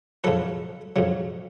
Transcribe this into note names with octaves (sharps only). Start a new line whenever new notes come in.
F2 C#3 F#3 A4 B4
F2 C#3 F#3